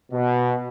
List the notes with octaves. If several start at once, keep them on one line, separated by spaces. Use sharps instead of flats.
B2